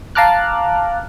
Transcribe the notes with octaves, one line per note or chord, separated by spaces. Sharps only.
F5 A5 A#5 D6 F6 F#6